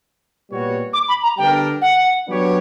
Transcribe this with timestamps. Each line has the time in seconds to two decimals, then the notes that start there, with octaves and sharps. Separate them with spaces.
0.49 A#2 G3 B3 F#4 C#5
0.93 D6
1.08 B5
1.23 A#5
1.38 D3 G3 B3 D4 A#4 G5
1.82 F#5
2.27 F#3 B3 D4 G4 C#5